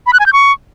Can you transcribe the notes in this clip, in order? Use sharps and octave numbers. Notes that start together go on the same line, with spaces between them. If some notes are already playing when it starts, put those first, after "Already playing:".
B5
F#6
G#5
G6
C#6